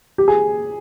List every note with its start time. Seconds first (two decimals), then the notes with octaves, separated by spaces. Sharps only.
0.18 G4
0.28 G#4